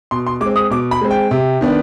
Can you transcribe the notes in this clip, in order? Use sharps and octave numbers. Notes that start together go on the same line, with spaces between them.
B2 C6
C6
G#3 D6
C4
D#6
B2 D6
B5
G#3 C4
G5
C3
D#3 B3 D4